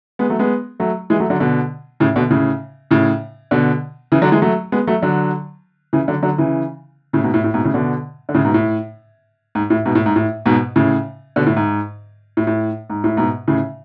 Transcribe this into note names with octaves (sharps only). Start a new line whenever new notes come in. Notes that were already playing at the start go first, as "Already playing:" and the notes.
G#3 B3
F#3 A3
G#3 B3
F#3 A3
E3 G#3
F#3 A3
D3 F#3
B2 D3
A2 C#3
B2 D3
A2 C#3
A2 C#3
B2 D3
C#3 E3
D3 F#3
E3 G#3
F#3 A3
G#3 B3
F#3 A3
D3 F#3
C#3 E3
D3 F#3
D3 F#3
C#3 E3
A2 C#3
G#2 B2
A2
A2
G#2 B2
A2 C#3
B2 D3
D3
A2 C#3
G#2 B2
A2
G#2
A2
G#2 B2
A2
G#2
A2
G#2 B2
A2 C#3
B2 D3
A2
G#2
A2
A2
G#2
A2
G#2 B2
A2 C#3